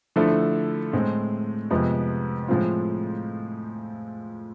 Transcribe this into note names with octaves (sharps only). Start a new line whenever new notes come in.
D3 F3 A3 E4
A2 G#3 C4
F2 C3 F3 G#3 B3
A2 F3 G#3 C4 F4